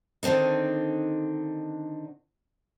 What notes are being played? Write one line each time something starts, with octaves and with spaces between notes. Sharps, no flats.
D3 D#3 C4 D4 D#4